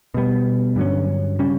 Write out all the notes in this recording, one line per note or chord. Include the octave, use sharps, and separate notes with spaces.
B2 G3 B3
G2 D3 F#3 C#4
C#3 G3 C#4